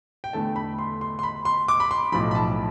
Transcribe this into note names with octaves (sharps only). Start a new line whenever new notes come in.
G5
E2 D3 A3 A5
B5
C6
C6
C6
B5
C6
D6
B5
C6
B1 A2 F3 B5
B5
A5